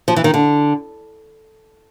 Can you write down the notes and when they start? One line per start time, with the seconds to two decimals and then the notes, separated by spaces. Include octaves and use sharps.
0.08 F3
0.16 E3
0.24 D#3
0.34 D3